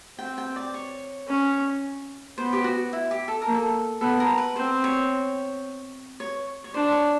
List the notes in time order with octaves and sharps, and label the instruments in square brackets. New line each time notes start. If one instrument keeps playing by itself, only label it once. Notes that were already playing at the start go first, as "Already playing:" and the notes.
[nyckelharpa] C4 [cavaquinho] G5
[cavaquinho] G5
D5
C#5
[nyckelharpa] C#4
[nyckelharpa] B3 [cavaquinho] C5
[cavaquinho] G4
F#4
E4
G4
A4
[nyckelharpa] A#3 [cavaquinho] A#4
[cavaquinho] A4
[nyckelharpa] B3 [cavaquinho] A4
[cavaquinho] A#4
B4
[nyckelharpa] C4 [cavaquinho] C5
[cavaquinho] C#5
C#5
C#5
[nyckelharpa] D4 [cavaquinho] C5
[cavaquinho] C#5